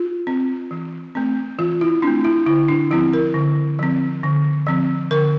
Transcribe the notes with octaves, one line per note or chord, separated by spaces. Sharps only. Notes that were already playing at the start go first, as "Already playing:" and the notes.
Already playing: F4
C4
E3
A3 C4
E3 F4
E4
A3 C4 D4
E4
D3 E4
D4
F3 C4 E4
A#4
D3
F3 C4
D3
F3 C4
D3 A#4